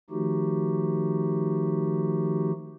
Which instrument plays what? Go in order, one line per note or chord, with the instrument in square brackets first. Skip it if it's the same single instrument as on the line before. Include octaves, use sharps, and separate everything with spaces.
[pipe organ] D#3 F3 A3 D#4 F#4 G4